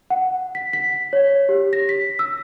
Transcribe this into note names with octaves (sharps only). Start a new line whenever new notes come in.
F#5
B6
B6
C#5
G4
A#6
B6
E6